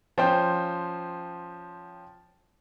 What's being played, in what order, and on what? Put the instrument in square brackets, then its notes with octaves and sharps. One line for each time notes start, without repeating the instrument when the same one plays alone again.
[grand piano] F3 C#4 C5 G5 G6